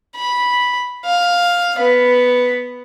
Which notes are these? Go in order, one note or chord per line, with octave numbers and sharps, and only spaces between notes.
B5
F5
B3 B4